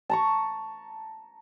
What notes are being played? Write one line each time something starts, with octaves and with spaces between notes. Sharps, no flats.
A5 A#5 C#6